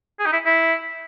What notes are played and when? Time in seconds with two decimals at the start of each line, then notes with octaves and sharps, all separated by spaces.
0.19 G#4
0.26 D#4
0.32 E4
0.45 E4